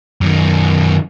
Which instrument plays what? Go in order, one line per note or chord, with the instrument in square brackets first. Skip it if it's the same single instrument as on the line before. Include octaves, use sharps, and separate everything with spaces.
[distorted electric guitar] F#2 D#3